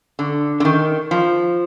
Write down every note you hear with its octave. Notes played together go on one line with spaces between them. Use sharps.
D3
D3
D#3
F3